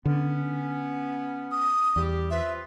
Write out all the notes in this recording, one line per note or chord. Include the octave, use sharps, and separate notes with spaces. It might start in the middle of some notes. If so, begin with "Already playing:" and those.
D3 B3 C#4
D#6
E2 G3 G4
C4 F4 B4 E5